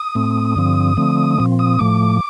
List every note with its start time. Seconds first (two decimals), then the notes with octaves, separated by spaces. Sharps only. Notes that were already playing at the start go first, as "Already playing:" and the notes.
Already playing: D#6
0.15 A2 A3 C4
0.56 G2 D3 F3 C4
0.97 D3 F3 A3 C4
1.38 A#2 F3 C4
1.59 D#6
1.79 A2 F3 A3 D6